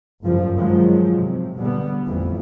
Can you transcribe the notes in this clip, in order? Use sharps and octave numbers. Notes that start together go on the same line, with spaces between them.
F#1 G2 F3 G3
D#3 F3 F#3 G#3
C3
B2 D3 G3 B3
A1 F2 E3